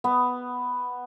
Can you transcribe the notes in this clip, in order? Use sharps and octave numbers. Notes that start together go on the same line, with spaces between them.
B3